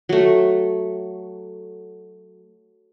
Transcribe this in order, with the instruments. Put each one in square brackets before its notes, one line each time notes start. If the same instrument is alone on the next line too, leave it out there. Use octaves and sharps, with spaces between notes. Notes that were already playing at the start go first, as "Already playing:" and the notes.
[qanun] F#3 A3